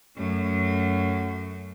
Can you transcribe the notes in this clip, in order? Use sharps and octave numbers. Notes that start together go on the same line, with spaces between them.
F#2 A3